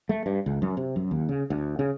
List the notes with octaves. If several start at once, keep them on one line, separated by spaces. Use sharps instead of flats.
A3
G2
C#2
F#2
C3
F#2
D#2
C#3
D2
C#3